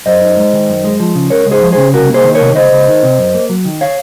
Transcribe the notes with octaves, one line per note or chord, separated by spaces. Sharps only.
F#2 C5 D#5
D#4
G#3
D#3
F#2
G#3
F3
C#3
C#2 A#4 C#5
G#3
G#4 C5
F3
C#3 G#4 C5
C2 F#4 A#4
A#3 G#4 C5
D#3
A#4 C#5
C3
C#2 C5 D#5
C#2
D#3
C3
F#2
A#3
F#3
D#3
C#5 F5